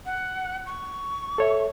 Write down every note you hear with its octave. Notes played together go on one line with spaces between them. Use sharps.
F#5
C#6
A4 C#5 E5